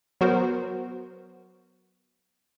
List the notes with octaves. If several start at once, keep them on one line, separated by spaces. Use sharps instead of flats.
F#3 B3 F#4 A#4 C5